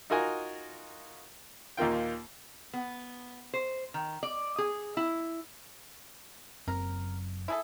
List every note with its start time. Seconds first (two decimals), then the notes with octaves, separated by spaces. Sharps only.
0.10 D#4 F4 F#4 A#4 D#5 G#5
1.77 D#2 A#2 A#3 F4 G5
2.73 B3
3.54 C5
3.94 D#3
4.23 D5
4.58 G#4
4.97 E4
6.68 F#1 F#2 C4 A#4
7.48 E4 G#4 A4